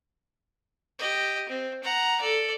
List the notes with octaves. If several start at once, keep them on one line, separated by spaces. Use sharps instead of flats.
G4 D#5
C4
F#5 A#5
A4 D5